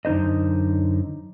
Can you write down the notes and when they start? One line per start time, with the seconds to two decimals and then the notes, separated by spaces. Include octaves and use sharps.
0.05 F#2 D3 D#4 C5 D#5